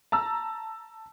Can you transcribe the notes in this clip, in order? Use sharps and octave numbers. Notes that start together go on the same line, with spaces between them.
A5 A#5 E6